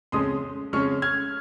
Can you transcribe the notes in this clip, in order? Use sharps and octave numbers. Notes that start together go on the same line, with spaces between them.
F2 C#3 G#3 C#4 C6 D#6
F2 C#3 G#3 C#4 C#6 F6
F6 G#6